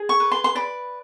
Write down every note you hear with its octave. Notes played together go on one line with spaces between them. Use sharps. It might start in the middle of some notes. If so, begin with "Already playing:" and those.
Already playing: G#4
C#6
B4
C6
C6
D5 B5